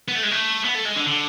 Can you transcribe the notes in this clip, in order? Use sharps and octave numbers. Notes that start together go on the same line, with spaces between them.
B3
A3
G#3
A3
B3
A3
G#3
D3
D3